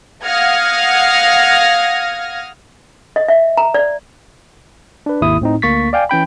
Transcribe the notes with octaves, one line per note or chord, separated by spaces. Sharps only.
F5 F#5 D#6 F6 G#6 A#6
D#5
E5
A#5
D5
D4 B4
G#1 D#2 E4 D#6
A2 C4 D#4
D2 A#3 C#6 A6 B6
D5 F5 G5 G#5
E3 C#4 G5 B5